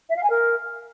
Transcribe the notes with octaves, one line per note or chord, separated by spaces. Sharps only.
E5
F5
G#5
A#4